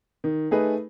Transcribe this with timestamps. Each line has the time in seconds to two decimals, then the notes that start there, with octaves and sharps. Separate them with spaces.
0.24 D#3
0.51 A3 D#4 G#4 B4